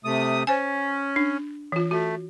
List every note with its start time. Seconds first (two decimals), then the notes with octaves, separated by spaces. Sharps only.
0.05 C3 A3 D#6
0.47 C#4 C5 G#5
1.16 D4
1.72 E3 F4
1.91 A3 F#4